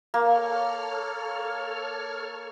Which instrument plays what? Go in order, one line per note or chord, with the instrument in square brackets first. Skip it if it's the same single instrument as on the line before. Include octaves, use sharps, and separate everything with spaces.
[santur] A#3 [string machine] A4 C#5 F6